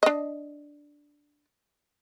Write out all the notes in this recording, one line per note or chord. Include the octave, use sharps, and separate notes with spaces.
D4 D#5